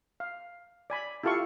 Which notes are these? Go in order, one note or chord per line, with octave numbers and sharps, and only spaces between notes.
F5
D5 G#5 B5
E4 F4 G4 A4 F5 C#6